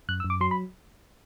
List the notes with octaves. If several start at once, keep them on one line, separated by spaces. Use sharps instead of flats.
F#2 F#6
E6
F#2
D6
F#3 C6
B5